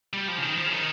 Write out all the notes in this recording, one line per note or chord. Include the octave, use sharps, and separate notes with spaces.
G3
F3
C#3
D#3
F3
C#3
D#3